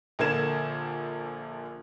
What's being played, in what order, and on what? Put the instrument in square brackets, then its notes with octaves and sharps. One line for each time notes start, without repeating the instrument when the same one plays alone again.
[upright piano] A#1 D3 A#3 G#6 E7